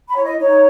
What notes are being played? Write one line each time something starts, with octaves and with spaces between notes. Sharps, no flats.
B5
E4 C#5
D#5
D#4 C#5